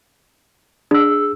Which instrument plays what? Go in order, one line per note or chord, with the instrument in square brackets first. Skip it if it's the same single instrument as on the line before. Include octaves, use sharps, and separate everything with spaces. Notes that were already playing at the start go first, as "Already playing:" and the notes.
[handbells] D4 [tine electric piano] G#4 E6